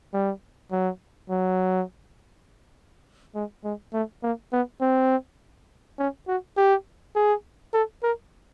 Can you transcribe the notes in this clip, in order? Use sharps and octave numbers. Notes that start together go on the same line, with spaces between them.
G3
F#3
F#3
G#3
G#3
A3
A#3
B3
C4
C#4
F#4
G4
G#4
A4
A#4